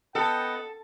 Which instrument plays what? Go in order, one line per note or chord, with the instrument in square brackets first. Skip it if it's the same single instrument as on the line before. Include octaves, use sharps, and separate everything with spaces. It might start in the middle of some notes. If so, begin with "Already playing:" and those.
[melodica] B3 D#5 F#5 [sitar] A4 [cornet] G5